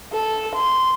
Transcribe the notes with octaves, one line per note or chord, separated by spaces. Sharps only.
A4
C6